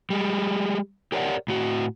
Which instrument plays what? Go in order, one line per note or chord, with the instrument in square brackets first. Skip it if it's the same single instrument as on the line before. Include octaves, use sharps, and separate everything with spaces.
[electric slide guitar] G3 G#3
G4 A#4 C#5 D5 F#5
A2 F#4